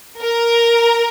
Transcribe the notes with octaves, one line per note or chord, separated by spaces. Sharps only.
A#4